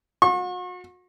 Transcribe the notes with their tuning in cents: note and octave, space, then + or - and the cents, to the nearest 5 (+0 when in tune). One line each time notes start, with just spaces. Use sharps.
F#4 -40 C#6 -40